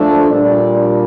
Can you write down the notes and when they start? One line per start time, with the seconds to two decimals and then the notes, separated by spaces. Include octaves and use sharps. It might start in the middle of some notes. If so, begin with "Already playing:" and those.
Already playing: F3 A3 D4
0.31 A#2 G3 D4 D5